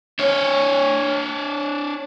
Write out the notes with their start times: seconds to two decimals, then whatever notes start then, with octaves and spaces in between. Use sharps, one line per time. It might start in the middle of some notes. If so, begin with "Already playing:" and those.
0.19 D4 C#5